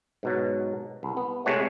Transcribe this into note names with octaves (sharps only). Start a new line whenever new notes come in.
G#2 B2 F#3
C2
B3
C3 G#3 A3 C#5 F#5